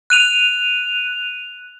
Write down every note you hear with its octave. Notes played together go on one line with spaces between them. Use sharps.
F#6 D#7 F7